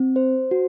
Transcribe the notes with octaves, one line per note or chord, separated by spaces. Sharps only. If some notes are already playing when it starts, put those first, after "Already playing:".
Already playing: C4
C5
F#4